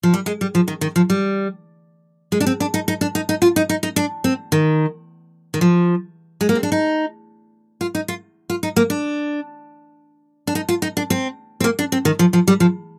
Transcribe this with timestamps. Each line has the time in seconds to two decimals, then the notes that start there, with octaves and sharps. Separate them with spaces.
0.03 F3
0.14 G3
0.26 G#3
0.41 G3
0.55 F3
0.68 D#3
0.81 D#3
0.96 F3
1.10 G3
2.32 G#3
2.40 D4
2.47 C4
2.60 D4
2.74 D#4
2.88 D#4
3.01 D4
3.15 D#4
3.29 D#4
3.42 F4
3.56 D#4
3.69 D#4
3.83 D#4
3.96 D4
4.24 C4
4.52 D#3
5.54 D#3
5.61 F3
6.41 G#3
6.49 A#3
6.55 C4
6.63 D4
6.72 D#4
7.81 F4
7.95 D#4
8.08 F4
8.50 F4
8.63 D#4
8.76 A#3
8.90 D4
10.47 D4
10.55 D#4
10.69 F4
10.82 D#4
10.97 D4
11.10 C4
11.60 C4
11.64 A#3
11.79 D4
11.92 C4
12.05 D#3
12.19 F3
12.33 F3
12.48 G3
12.60 F3